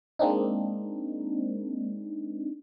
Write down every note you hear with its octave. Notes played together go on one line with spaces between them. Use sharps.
G#3 A#3 C4 D4 D#4